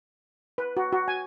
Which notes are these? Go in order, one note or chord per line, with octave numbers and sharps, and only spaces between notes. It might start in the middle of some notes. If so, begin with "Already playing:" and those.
B4
F#4
F#4
G#5